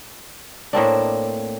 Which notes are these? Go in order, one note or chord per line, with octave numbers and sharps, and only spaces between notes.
A2 A#3 C4 D4